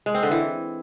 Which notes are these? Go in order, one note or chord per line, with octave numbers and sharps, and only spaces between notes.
G#3
C4
D3
E3